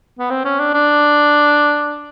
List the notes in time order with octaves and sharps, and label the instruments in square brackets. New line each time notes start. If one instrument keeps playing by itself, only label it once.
[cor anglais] B3
C4
C#4
D4
D4